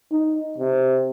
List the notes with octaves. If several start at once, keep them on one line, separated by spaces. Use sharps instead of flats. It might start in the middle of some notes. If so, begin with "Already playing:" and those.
D#4
C3